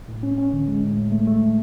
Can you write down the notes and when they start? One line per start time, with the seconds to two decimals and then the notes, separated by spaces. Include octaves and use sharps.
0.08 A2
0.23 C#4
0.38 C#4
0.53 D3
0.68 G#3
0.82 A2
0.98 A2
1.12 A3
1.27 A3